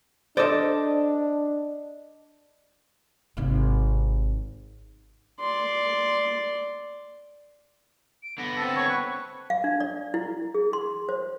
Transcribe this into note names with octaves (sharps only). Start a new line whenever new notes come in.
D4 A4 C5 D5 D#5
G#1 C3
D5 C6
D7
D3 B3 A#6
C4 A4 A5
C#5 C#6
B4
F5
D4
D5
E4
G#4
C6
C5